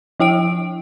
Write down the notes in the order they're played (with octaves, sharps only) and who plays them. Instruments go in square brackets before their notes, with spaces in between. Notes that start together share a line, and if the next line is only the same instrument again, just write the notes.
[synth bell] F3 E4 G5 D7